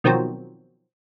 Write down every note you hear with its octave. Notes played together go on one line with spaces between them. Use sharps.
B2 D#3 F3 F#3 C4